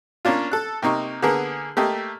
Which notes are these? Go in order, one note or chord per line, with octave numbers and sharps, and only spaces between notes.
A#3 C#4 D4 F4
A4 F#6
C3 A#3 D#4 C#6
D3 A#3 B3 G#4 A#4
A3 A#3 G4 D#5